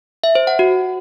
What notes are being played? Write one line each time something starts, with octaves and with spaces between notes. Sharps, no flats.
E5
C5
F#5
F#4